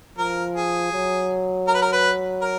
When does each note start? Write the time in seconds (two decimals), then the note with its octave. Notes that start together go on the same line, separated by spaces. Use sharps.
0.18 F3 A#4
0.55 G#4
0.93 F#3
1.67 A#4
1.74 B4
1.82 A#4
1.92 B4
2.42 A#4